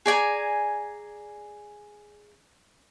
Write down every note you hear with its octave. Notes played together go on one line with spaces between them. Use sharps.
G#4 D5 G#5 A#5